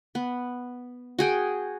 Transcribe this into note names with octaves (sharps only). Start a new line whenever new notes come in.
B3
F#4 G#4 G5